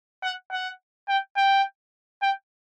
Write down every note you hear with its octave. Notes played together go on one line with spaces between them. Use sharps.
F#5
F#5
G5
G5
G5